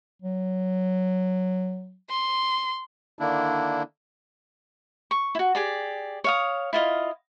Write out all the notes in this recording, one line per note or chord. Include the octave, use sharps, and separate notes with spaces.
F#3
C6
D3 D#3 A#3 D4 E4
C#6
E4 F#4
G4 G#4 D5
C#5 F5 D#6
E4 F4 D#5 F5